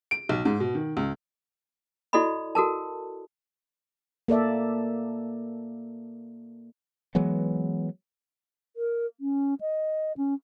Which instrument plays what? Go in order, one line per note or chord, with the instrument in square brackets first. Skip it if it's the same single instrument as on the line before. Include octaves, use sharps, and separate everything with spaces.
[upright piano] D7
B1
G#2
B2
D#3
C#2
[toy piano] E4 F#4 A4 D5 D#5 B5
F#4 A4 A#4 A5
[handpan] A#3 A4 D5 E5
[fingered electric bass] E3 F#3 G#3 B3
[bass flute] A#4
C#4
D#5
C#4